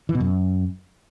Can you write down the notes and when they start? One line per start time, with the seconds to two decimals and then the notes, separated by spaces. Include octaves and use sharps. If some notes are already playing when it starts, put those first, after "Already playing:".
0.09 E3
0.15 B2
0.20 F#2